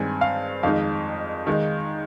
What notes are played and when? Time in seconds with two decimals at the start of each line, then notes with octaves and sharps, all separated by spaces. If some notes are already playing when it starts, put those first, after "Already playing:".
Already playing: G2 D#3 G#3 C4 G#5
0.21 F5
0.63 F2 D#3 G#3 D#4 F5
1.47 D#3 G#3 D#4